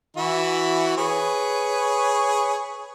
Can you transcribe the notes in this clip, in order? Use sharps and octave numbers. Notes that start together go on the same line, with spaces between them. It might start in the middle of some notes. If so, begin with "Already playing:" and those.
E3 E4 F#4
G#4 B4 C#5